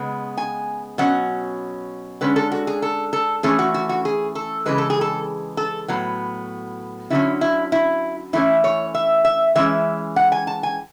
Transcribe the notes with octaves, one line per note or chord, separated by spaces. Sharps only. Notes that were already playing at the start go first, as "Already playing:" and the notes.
Already playing: C#3 G#3 B3
G#5
B2 F#3 C#4 F#5
D3 G#3 C#4 B4
A4
F#4
G#4
A4
A4
E3 A3 C#4 G#4
F#4
F#4
F#4
G#4
A4
C#3 E3 G#3 B4
A4
G#4
A4
A4
A2 F#3 B3
D3 F#3 C#4 E4
E4
E4
E3 A3 C#4 E4
C#5
E5
E5
E3 G#3 C#4 E5
F#5
G#5
A5
G#5